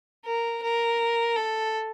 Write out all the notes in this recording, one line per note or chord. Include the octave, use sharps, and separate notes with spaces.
A#4
A#4
A4